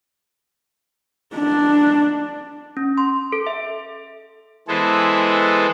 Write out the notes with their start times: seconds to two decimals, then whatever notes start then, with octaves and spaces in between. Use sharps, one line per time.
1.35 D4
2.77 C#4
2.98 C6
3.32 A4
3.47 E5
4.68 E3 G#3 B3 G#4 A4 C5